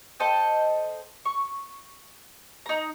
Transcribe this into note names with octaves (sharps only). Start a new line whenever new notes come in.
A4 C5 D#5 G5
C#6
D#4 A#5